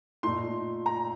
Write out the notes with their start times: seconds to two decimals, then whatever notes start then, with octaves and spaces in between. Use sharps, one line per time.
0.23 A#2 A3 D#4 C6
0.86 A#5